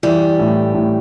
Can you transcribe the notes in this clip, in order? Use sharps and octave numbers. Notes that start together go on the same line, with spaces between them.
E3 G3
A2
A2